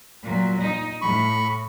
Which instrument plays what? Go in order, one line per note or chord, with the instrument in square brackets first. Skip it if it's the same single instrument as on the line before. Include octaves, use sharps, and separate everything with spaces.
[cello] A#2 F#3
D#4
[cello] A2 [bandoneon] B5 C#6